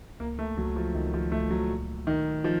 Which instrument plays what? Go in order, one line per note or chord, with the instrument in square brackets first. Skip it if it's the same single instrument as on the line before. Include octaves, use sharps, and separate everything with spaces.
[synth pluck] C#2 [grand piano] A#3
[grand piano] A3
[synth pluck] C#2 [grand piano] F#3
[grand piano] F3
[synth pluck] C#2 [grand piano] D#3
[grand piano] F3
[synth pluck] C#2 [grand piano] A3
[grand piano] F#3
[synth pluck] A#2
[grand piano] D#3 [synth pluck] D#4
[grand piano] F3 [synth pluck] D#4